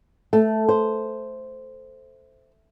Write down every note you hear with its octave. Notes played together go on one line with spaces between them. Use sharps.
A3
C5